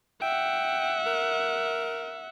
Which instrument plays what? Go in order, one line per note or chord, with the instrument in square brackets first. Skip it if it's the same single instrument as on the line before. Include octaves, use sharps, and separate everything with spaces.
[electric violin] E5 F#5 [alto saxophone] G5
[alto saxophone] A#4